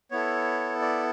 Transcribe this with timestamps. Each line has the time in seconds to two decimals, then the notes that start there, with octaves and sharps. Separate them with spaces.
0.11 B3 E4 A4 C#5
0.82 D5